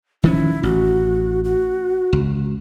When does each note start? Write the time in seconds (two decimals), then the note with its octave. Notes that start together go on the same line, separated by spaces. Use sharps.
0.24 D#3 F3 C#4 E4
0.63 A1 F#4
1.44 F#4
2.13 C#2